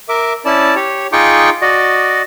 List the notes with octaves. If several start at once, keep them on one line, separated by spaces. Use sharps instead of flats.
A#4 E5 D6
C#4 E4 D5 A5
G4 C#5
D#4 F4 G#4 G5 C#6 D6
F#4 D5 D#5